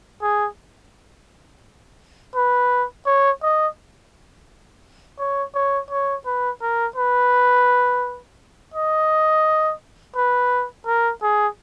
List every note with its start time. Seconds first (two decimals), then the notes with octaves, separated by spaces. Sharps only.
0.22 G#4
2.35 B4
3.06 C#5
3.42 D#5
5.19 C#5
5.55 C#5
5.90 C#5
6.26 B4
6.62 A#4
6.96 B4
8.74 D#5
10.16 B4
10.86 A#4
11.22 G#4